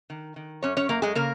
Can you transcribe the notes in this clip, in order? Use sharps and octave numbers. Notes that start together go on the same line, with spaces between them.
D#3
D#3
F#2 C#4 C#5
C#4 C#5
F#2 A#3 A#4
G#3 G#4
C#3 A#3 A#4